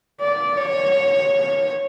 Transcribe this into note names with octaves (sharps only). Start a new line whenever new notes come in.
D5
C#5